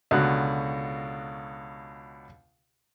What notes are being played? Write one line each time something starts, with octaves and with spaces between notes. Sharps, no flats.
C#2 B2 D3 F#4 F#6